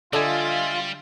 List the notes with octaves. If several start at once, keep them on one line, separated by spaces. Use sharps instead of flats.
D3 G3 F4 D#5 E5 G#5